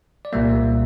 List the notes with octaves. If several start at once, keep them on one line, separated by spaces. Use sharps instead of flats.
D5
C2 A#2 G3 A#3 E5